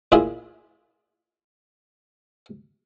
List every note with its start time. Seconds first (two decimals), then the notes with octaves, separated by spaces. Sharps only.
0.12 A#2 E4 F4 G#4